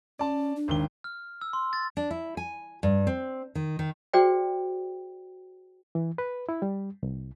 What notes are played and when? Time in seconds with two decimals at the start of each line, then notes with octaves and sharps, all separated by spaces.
0.19 C#4 D5 A5
0.56 D4
0.68 G#1 D#2 G7
1.04 F6
1.41 E6
1.53 C6
1.73 A6
1.97 D4
2.11 E4
2.37 G#5
2.83 G2
3.07 C4
3.55 D#3
3.79 D#3
4.13 F#4 G#4 C5 D5 G5
5.95 E3
6.18 B4
6.49 E4
6.62 G3
7.03 C2